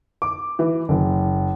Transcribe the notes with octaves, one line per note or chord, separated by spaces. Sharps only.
D6
E3
F#1